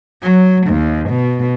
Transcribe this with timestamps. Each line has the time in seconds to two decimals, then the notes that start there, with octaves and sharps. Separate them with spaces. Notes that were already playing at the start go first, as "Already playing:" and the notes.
0.23 F#3
0.67 D#2
1.09 B2